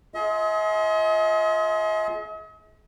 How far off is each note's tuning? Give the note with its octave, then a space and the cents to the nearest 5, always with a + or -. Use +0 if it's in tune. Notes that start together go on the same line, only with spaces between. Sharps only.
F4 +0 G#4 +30 D#5 +45